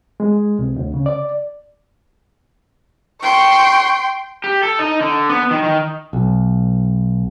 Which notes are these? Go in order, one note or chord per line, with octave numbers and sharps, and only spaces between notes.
G#3
C2
D2
C#3
D5
G5 C6 C#6
G4
A4
D#4
D3
B3
D#3
D#3
B1